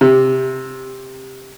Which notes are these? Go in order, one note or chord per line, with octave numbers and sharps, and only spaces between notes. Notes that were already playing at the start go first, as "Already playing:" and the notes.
C3